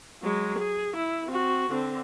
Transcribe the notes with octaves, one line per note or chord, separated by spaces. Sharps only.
F#3 G#3
G#4
E4
C4 F#4
D3 C4